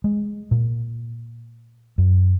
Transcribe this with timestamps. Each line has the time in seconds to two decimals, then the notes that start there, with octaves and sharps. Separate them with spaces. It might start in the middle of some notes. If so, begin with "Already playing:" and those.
0.04 G#3
0.51 A#2
1.98 F#2